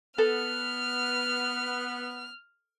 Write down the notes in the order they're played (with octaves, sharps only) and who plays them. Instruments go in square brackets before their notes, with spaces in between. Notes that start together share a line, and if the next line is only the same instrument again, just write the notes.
[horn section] B3 [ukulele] A4 [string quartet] F6